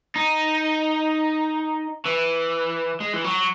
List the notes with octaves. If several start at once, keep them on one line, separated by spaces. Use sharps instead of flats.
D#4
E3
G#3
E3
F#3